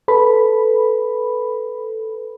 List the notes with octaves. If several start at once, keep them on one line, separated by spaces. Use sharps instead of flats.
A4 B4 B5